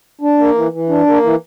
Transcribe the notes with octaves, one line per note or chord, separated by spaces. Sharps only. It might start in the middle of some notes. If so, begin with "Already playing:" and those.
D4
A#3
E3
E3
D4
A#3
E3